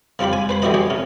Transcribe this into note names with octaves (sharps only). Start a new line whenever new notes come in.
C#3 C4 F4 G4 B5
G#5
B4 C5 B5
D3 E3 F#4 G4 D#5 B5
G4 G#4 C#5
C3 C#4